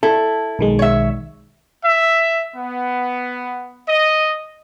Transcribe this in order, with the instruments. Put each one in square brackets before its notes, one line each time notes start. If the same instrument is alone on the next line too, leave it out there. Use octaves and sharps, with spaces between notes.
[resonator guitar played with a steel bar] E4 [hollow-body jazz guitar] A4
[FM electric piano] B1 D#3 G#3
[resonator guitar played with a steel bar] C#5 E5
[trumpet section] E5
B3
D#5